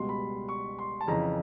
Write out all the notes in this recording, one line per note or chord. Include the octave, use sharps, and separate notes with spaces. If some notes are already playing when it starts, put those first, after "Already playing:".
Already playing: C#2 B2 G3 C6
B5
C#6
C6
A5
F2 C#3 E3 A#5